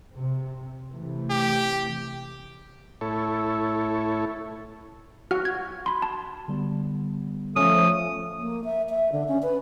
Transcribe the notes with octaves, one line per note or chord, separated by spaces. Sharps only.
C3
C3 E3 A3
G4
A2 E4 A4 C#5
F#4 F#5 F6
G#6
B5 C6
A5
D3 G3 B3
F3 A3 C#4 D#6
A#3
E5
E5
D3
C#4
B4